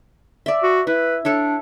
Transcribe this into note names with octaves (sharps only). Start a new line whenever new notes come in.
D5 E5
F#4
E4 B4
D4 A4 C#5 E5